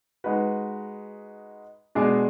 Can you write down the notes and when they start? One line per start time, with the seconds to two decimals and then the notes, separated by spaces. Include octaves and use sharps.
0.24 G#3 D#4 F#4 B4
1.95 B2 G#3 D4 G#4 D5